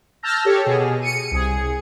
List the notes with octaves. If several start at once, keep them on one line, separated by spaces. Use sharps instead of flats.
A5 E6 F6 G6 A#6
G4 A4 C#5
B2 G#4
C#7 D#7
C2 G#4